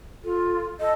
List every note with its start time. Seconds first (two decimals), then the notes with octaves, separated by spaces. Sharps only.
0.24 F4 A4
0.80 A4 D#5